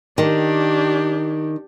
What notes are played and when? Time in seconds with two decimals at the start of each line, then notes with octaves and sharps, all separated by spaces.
0.18 D#3 D4 G4